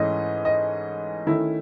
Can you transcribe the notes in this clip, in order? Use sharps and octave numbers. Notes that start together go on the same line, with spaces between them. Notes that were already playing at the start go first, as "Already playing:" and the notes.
Already playing: G#2 E3 A3 C#4 D#5
D#5
D#3 A3 C#4 E4